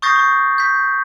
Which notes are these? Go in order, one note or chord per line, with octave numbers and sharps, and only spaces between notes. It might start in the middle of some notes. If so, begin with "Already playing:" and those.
C#6 D#6 G6 A6 A#6 C7
C#6
G6 B6